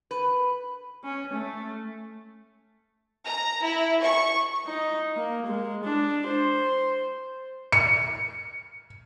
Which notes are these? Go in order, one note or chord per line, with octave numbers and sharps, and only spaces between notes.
B4
C#4
A3
A#5
E4
C#6
D#4
A#3
G#3
D4
C5
C#7